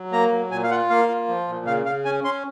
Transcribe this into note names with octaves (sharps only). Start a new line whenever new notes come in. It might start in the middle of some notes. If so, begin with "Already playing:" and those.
Already playing: F#3
A#3 A#5
F#3
A#2 G#5
F5
F4 F#5
A#3 F5
F4
F3
A#2
C#3 F5
C#3 F5
C#4 G#5
C#4 C6